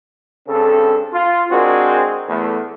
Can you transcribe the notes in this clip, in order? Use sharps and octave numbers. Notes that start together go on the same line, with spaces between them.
G2 C#3 C4 A4
F4
G#3 C4 D4 F#4 G#4 A#4
E2 A3